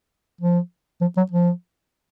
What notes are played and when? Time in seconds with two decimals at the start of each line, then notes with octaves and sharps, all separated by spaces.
0.41 F3
1.01 F3
1.17 F#3
1.32 F3